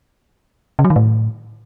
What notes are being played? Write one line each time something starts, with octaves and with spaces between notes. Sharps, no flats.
C#3
F#3
D#3
A2